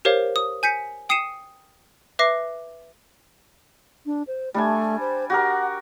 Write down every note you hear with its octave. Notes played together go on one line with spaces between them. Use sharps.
G4 A#4 C5 C#5 F5
D#6
G#5 G6 B6 C#7
G5 D#6 C7 C#7 D#7 E7
B4 E5 D6 A#6 C7
D4
C5
G3 A3 D4 G#5
C5
F#4 G4 A#4 F#5